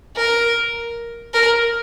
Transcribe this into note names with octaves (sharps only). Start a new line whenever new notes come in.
A#4
A#4